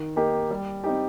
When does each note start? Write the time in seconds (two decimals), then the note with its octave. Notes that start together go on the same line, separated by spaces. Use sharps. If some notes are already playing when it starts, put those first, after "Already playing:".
Already playing: D#3
0.16 A#3 D#4 G4
0.50 G3
0.84 C4 D#4 G4